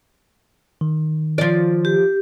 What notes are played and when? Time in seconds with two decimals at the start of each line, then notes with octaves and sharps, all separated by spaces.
0.81 D#3
1.38 F3 D5
1.85 G4